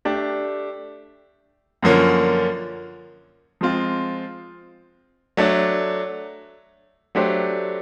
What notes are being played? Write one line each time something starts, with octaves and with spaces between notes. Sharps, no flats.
A3 D4 G4
F#2 D3 F3 A#3 C#4
F3 G#3 C4 F4
F#3 A3 D4
F#3 A3 D4 G4 C5